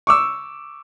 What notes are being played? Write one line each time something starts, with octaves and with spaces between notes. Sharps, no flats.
C#6 D6 E6